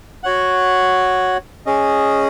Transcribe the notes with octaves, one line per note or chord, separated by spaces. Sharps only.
F#4 C#5 F#5
C#4 G#4 D#5